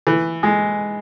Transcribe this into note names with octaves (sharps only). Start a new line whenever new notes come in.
E3
G#3